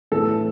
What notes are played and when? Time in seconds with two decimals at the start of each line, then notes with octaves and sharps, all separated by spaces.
0.12 A2 E3 A4